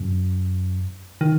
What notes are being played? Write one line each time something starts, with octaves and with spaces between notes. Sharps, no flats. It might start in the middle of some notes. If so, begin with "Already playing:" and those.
Already playing: F#2
D#3